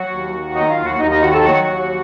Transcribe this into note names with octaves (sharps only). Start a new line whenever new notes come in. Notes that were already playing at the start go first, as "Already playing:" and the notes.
Already playing: F#3 F#4 F#5
D#2
D#3
F#3 D#4 D#5
F4 F5
D#2
F#4 F#5
D#2 D#4 D#5
D#4 D#5
D#3 F#4 F#5
A4 A5
F#3 F#4 F#5
D#2